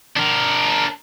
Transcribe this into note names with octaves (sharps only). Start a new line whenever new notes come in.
D4 A#4